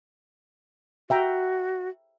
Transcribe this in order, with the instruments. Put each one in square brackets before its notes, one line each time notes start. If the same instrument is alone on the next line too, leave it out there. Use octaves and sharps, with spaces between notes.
[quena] F#4 [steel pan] E5 G5 A#5